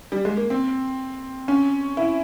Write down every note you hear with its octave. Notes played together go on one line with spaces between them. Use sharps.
G3
G#3
A#3
C4
C#4
E4